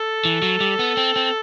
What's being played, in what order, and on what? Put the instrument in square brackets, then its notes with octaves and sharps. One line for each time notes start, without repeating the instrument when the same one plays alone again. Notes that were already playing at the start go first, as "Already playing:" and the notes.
Already playing: [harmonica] A4
[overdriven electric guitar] E3
F#3
G3
B3
C4
C4